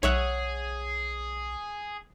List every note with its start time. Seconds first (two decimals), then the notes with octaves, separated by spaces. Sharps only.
0.03 B1 G#4 C#5 E5 F#5